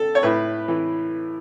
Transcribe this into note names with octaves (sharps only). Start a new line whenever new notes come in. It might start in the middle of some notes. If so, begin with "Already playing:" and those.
Already playing: A4
C#5
A2 B4
E3